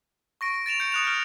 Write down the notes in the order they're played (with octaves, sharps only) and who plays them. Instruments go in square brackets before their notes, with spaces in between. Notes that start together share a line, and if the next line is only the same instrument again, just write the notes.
[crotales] C#6 A#6 D7
A6 D7 E7 F7
G6 C#7
D#6 F#6 F7
F6 D7